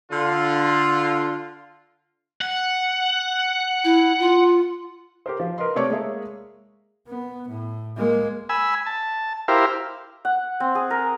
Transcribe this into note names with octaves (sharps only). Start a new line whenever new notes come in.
D3 F4
F#5
E4
F4
G4 A#4 C5
F3
A#4 B4 D#5 C6
C3 A3 C#5 D5 C#6 D6
G#3 A#3 G#4 C#5 E5
B3
A2
G#3 A#3
G#5 B5 E6
A5
E4 G4 A#4 C5 F5
F#5
C4
G#4
A#4